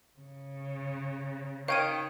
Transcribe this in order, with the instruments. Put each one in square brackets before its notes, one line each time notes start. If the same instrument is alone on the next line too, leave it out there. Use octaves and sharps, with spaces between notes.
[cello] C#3
[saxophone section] D#3 [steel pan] C#5 [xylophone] F5 G5 D#7